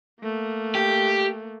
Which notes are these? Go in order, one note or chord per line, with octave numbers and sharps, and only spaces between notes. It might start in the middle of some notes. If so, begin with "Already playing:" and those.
A3 A#3
G4